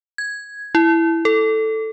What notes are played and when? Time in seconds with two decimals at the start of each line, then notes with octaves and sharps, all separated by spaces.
0.18 G#6
0.75 E4
1.25 A4